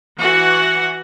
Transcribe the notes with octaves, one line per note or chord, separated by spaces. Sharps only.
E3 F#4 F#5